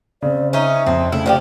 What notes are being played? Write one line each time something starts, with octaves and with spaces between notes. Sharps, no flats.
C#3 C4 D5
C#4 D#4 E5
F2 C4
C#3 A3 E4
F3 F#4 G4 D5